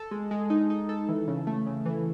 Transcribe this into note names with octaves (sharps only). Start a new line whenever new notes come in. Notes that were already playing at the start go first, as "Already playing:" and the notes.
Already playing: A4
G#3
G#3
D#4
D#4
A4
E3
C#3
A3
C#3
E3